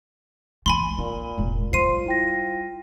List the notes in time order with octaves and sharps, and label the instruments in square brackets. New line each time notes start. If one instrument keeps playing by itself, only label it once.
[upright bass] E3 A#3 [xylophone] G#5 B5 C6
[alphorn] A#2 [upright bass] A#3
[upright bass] E1 A1
[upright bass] G3 [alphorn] F4 [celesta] C5 C6 [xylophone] C7 D#7
[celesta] E4 G5 A#6